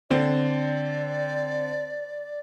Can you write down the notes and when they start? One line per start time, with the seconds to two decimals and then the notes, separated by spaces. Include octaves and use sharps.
0.10 D3 C4 D5